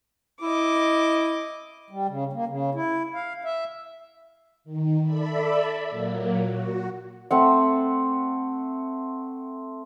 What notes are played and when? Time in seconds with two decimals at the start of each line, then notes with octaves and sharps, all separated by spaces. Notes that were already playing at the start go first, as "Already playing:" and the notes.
0.42 E4 D#5 D6
1.90 G3
2.09 C#3
2.33 A#3
2.48 C#3
2.75 E4
3.14 F5
3.45 E5
4.64 D#3
5.03 A4 D5 E5 B5
5.89 A#2 F#3 A#3
6.45 F#4
7.31 A3 C4 F#5